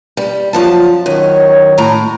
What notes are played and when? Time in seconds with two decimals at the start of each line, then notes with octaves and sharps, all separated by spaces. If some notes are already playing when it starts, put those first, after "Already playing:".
0.17 G3
0.53 F#2 F3 A5
1.06 F#2 D#3 C#5
1.78 A2 A#5